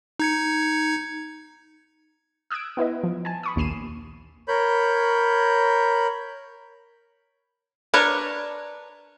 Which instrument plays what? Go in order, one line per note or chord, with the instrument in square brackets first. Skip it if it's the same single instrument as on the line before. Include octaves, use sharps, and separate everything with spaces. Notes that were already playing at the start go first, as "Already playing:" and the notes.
[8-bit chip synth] D#4 G#6 C#7
[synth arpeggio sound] D#6 E6 F#6 G#6 D7
B3 E4 B4 D#5
F3
G#5 A5
B5 C#6 D#6
A#1 D#2 C7 D#7 E7
[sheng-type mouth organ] A#4 C#5 B5 G6
[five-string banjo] D4 A#4 B4 C#5